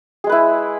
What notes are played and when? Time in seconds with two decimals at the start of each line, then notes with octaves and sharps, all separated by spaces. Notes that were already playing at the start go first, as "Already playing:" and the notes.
0.24 G#4
0.27 G#3
0.29 B4
0.32 E4